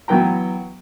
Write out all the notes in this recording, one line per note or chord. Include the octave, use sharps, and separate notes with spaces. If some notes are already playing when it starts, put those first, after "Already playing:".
E3 F#3 B3 G5 A#5